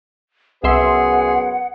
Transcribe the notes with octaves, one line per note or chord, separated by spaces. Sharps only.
C2 F#2 B3 G#4 B4 E5 F#5 C6